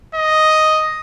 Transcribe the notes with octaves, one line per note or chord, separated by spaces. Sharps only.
D#5